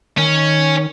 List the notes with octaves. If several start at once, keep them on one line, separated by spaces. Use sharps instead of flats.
D#3 C#4